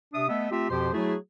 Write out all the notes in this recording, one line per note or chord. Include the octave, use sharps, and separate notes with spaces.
C3 D4 E5 D#6
A3 B3 D#5 E5
A3 C4 F4 G4 E5
F2 B2 F3 G4 C5 C6
F#3 A3 E4 F#4 G#4